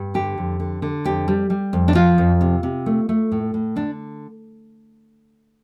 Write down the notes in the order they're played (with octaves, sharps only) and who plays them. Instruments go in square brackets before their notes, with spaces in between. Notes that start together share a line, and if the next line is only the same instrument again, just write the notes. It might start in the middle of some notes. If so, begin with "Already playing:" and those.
Already playing: [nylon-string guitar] G2
D3 G4
F2
D3
D3
F2 G4
G3
G3
F2
D4
F3 F4
F2
C3
C3
A3
A3
A2
A2
D3 D4